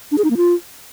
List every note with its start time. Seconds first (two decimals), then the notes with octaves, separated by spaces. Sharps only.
0.12 D4
0.18 G#4
0.24 D#4
0.31 A#3
0.37 F4